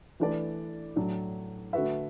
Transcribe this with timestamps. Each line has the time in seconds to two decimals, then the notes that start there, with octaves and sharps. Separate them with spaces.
0.20 E3 A3 D4 B4 D5
0.96 A2 F#3 D4
1.73 D3 A3 F#4 B4 E5